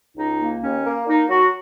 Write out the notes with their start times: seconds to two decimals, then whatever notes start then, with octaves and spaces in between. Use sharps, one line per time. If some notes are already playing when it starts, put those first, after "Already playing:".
0.16 C#2 D#4
0.40 A#3
0.61 D#2 C#4
0.85 A#3
1.06 A#3 D#4
1.29 F#3 F#4